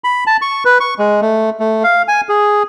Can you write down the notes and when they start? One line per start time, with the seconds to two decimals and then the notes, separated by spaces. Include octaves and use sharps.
0.04 B5
0.27 A5
0.42 C#6
0.65 B4
0.80 C#6
0.99 G#3
1.21 A3
1.60 A3
1.84 F5
2.08 G#5
2.29 G#4